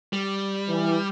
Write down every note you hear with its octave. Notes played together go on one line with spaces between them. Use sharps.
G3
E3